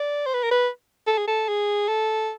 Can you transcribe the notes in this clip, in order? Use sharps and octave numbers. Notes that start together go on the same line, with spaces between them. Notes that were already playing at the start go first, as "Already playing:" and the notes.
Already playing: D5
C5
B4
A#4
B4
A4
G#4
A4
G#4
A4